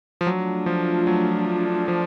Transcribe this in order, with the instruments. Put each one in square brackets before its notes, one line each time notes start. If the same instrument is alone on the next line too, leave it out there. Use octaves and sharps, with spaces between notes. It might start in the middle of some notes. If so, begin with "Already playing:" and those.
[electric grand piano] F3
[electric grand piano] F#3 [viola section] A3 D4 F4
[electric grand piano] F3
F#3
F3